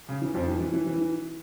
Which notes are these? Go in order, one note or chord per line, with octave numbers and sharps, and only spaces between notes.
C#3
E3
F2 F3
E3
E3
E3
E3